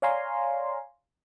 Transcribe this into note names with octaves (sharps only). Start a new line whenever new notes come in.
C#5 D5 F5 G#5 A#5 C6